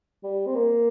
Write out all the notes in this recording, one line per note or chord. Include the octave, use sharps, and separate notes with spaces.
G3
C4
A#3